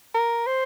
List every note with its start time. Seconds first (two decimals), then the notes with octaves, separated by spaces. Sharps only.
0.14 A#4
0.47 C5